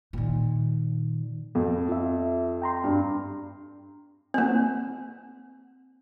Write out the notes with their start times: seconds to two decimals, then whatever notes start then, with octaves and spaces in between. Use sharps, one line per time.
0.13 A#2 D#3
1.55 F2
1.89 F4 E5
2.62 G5 A#5 C6
2.84 G2
4.34 A#3 C4